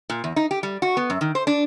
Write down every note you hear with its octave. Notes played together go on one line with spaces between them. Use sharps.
A#2
E2
D#4
G4
G3
F#4
B3
F#2
D#3
C5
D4